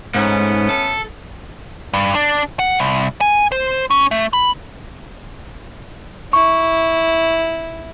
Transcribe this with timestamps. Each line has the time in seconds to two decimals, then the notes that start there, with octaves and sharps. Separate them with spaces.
0.15 G#2 A3 B3 C#4
0.69 A4
1.93 G2
2.15 D4
2.59 F#5
2.78 C2
3.21 G#5
3.52 C5
3.91 C#4
4.11 A3
4.33 B5
6.33 E4 C#6